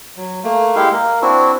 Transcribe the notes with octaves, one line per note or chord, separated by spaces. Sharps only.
F#3
A3 A#3
G#3 E4 G4 F5
A#3 A#4
C4 D4 E4 F#4